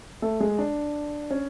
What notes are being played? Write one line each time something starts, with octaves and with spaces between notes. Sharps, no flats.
A3 A4
G#3 G#4
D4
C#4